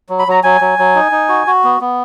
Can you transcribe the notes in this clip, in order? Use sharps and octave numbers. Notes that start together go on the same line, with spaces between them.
F#3
B5
F#3 A#5
F#3 G#5
F#3
F#3
D#4
D#4
F#4
F#4
B3
B3